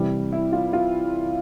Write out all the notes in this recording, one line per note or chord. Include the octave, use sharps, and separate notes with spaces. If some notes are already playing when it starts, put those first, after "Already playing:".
Already playing: C3 E3 G3
E4
F4
F4